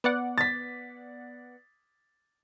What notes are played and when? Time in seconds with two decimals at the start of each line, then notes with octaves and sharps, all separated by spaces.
0.04 B3 D5 F#5
0.38 A6 B6